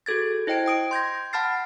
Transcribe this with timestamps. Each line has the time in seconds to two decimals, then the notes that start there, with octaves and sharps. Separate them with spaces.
0.06 F#4 G#4 A4 G#6 A6
0.47 E4 C5 D#5 G5 G#6 D7
0.66 G5 D#6 D7
0.91 C6 G6 G#6 A#6
1.33 F#5 A5 B5 F6 A6 C7